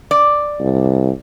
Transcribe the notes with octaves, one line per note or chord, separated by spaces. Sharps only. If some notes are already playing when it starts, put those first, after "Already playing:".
D5
C2